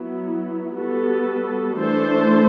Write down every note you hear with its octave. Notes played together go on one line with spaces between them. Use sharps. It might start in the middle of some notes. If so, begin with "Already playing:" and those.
Already playing: F#3 B3 E4
G3 B3 F#4 A4
E3 A3 D4 A4 C5